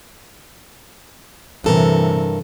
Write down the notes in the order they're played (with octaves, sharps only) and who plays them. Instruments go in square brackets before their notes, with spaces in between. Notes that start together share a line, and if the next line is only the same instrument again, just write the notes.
[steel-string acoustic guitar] G2 A4 A#4 [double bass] C3 E3